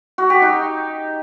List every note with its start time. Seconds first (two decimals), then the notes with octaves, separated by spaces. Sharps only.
0.18 F#4
0.30 G4
0.42 D#4